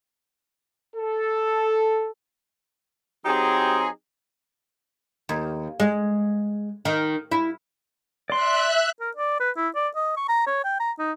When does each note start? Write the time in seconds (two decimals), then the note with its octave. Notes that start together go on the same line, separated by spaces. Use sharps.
0.96 A4
3.25 F#3 C4 D#4 G4 G#4
5.29 D#2
5.80 G#3
6.85 D#3
7.32 E4
8.30 D5 E5 C6 F#6
9.00 A#4
9.17 D5
9.40 B4
9.57 E4
9.75 D5
9.96 D#5
10.17 C#6
10.29 A#5
10.47 C#5
10.64 G5
10.80 A#5
10.99 D#4